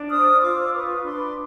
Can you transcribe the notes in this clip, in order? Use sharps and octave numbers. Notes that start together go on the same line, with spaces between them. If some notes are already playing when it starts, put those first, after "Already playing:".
Already playing: D4
C5 D#6 F6
F4 D6 E6
B4 C#6 D#6
D4 C6 D6